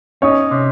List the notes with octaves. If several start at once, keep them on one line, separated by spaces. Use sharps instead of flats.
C#4 D#4 C#5
C3